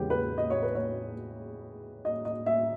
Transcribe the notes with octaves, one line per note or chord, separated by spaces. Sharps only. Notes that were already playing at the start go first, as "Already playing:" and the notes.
Already playing: E2 C#3 G#3 B3 G4
B4
D#5
C#5
B4
C#5
D#5
D#5
E5